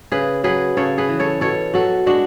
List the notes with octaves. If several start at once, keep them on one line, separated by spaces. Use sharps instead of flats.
C#3 G#4 B4
F#3 G#4 B4
C#3 A4 C#5
G#4 B4
E3
A4 C#5
B2 A4 C#5
F#3 F#4 A4
G#3 D4 F#4